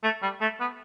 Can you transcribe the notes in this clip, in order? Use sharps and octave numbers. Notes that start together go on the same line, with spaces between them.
A3
G3
A3
B3